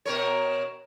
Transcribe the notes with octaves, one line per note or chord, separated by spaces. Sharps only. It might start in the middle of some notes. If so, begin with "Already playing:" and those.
B2 A#4 C#5